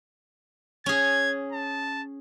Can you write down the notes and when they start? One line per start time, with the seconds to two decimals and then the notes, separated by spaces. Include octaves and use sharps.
0.86 C#4 G#4 G#6
1.52 A5